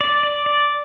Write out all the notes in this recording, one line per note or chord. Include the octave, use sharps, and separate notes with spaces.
D5
D5
D5